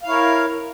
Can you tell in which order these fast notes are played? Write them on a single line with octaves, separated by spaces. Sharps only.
F5 E4 C#5 A#4